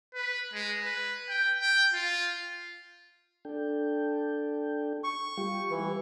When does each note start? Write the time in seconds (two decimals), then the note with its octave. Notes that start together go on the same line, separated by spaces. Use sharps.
0.15 B4
0.53 G#3
0.84 B4
1.29 G5
1.60 G5
1.94 F4
3.45 D4 A4 G5
5.04 C#6
5.38 G3 F4 G4
5.71 E3